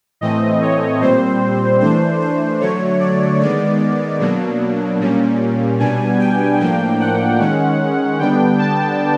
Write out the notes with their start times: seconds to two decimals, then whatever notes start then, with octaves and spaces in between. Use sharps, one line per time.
0.21 A2 E3 A3 C4 D#5
0.61 C#5
1.00 A#2 G3 C4 C5
1.81 E3 A3 D4 C5
2.21 C5
2.60 D3 F#3 A3 C#5
3.00 D5
3.40 D#3 G#3 B3 D5
4.20 B2 F#3 A#3 D4
5.00 A#2 G3 A#3 C#4
5.79 B2 G3 B3 D4 G#5
6.19 G5
6.59 A2 F3 A#3 D4 G5
7.00 F#5
7.39 D#3 G#3 C#4
8.19 D3 G3 B3 D4 G5
8.59 A5